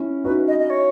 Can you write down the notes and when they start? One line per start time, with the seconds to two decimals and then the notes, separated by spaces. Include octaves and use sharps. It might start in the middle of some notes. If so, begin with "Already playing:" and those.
Already playing: C#4 E4
0.24 D#4 F#4 B4
0.47 D#5
0.59 D#5
0.70 C#5